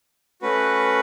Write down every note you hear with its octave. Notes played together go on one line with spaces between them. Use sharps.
A3 C#4 F#4 B4